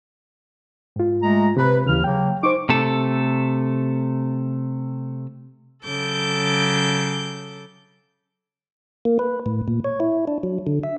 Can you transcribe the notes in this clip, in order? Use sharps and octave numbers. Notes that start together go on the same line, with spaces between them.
G#2 F4
G#3 A3 A#5
C3 B4 B5
D#2 C#3 E3 F6
C#3 F#3 A#3 G5
D#4 C5 C#6 D6
C3 A3 A4
C#3 F#3 A4 D6 G6
A#3
B4
A2
A#2
C#5
E4
D4
F#3
D3
E5